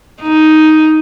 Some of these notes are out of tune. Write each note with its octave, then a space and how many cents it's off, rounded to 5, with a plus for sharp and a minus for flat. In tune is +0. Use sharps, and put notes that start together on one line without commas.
D#4 +5